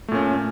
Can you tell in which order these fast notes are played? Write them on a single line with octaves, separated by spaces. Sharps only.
A3 A#2 C#4